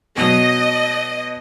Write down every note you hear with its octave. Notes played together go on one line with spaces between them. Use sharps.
B2 F#3 D#5